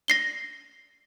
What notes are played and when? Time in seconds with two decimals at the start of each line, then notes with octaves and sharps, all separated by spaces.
0.08 A#6 C7 G7